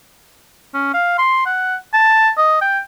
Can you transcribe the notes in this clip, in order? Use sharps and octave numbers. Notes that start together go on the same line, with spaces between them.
C#4
F5
C6
F#5
A5
D#5
G5